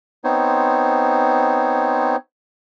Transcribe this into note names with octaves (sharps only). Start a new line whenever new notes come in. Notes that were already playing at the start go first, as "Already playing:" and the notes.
B3 C4 D#4 C5 C#5